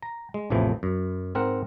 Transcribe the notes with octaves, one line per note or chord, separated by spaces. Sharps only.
A#5
G#3
A1 E2 A2 C3 E3 F3
F#2
G#2 C4 A#4 F#5 A#5